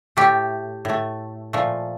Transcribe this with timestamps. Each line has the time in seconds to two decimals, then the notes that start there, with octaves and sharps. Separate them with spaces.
0.17 A2 A3 G4
0.85 A2 A3
1.53 A#2 F3 A3